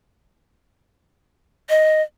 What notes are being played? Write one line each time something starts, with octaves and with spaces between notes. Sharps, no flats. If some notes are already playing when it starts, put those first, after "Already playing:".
D#5